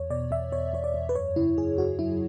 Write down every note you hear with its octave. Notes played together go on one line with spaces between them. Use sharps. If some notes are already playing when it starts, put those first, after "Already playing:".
Already playing: E2 C#5
B2 D5
E2 E5
B2 C#5
E2 C#5
D5
E2
B4
F#2 C#5
C#3 E4
F#2 G#4
F#2 F#4
F#3 E4